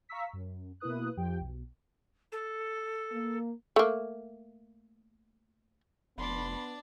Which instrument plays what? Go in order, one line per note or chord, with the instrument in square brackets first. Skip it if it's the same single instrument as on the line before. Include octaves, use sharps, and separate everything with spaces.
[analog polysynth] F5 A#5 C#6 E6 B6
F#2
B2 A#3 E4 B4 D#6 F#6
F2 F3 G4 G5
B1
[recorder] A4
[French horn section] A#3
[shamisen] A3 A#3
[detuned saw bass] F1 [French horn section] B3 [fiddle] D4 D5 [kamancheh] B5 C6